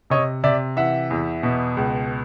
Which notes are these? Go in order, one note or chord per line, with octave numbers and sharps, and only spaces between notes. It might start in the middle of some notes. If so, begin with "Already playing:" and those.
C3 C#5 D#5
C3 D5 E5
E3 E5 F#5
E2
B2
C#2